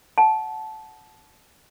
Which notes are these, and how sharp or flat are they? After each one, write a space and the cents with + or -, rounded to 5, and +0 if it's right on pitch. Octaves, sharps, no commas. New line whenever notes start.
F#5 +0 A5 -15